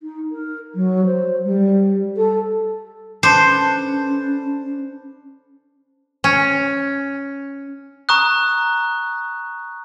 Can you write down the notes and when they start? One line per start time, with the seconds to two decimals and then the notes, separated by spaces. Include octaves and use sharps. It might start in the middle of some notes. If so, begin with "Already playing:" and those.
0.01 D#4
0.31 A#4
0.75 F#3
1.05 C5
1.44 G3
2.16 A4
3.23 C#4 D4 A4 B4 C5
6.24 C#4
8.09 A#5 C#6 D#6 F#6